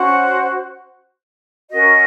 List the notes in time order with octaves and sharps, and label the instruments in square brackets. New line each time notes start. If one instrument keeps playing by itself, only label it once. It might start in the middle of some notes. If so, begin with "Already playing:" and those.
Already playing: [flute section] C#4 F#4 C5 F#5
C#4 F#4 A#4 D#5